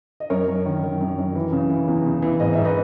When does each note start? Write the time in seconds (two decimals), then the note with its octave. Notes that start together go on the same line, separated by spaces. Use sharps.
0.20 D#5
0.30 F#2 A#4 C#5
0.48 F#2
0.66 D#3
0.83 D#3
1.01 F#2
1.18 F#2
1.35 E3
1.52 C#3
1.70 E3
1.88 E2
2.06 C#3
2.22 E3
2.40 G#2 D#5
2.53 G#2 E5
2.65 B4 D#5